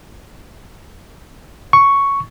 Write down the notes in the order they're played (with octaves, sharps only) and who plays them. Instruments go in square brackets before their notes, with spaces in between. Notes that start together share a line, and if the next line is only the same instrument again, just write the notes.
[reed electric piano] C#6